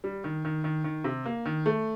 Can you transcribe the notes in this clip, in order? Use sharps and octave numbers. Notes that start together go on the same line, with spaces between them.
G3
D#3
D#3
D#3
D#3
C3
A#3
D#3
A3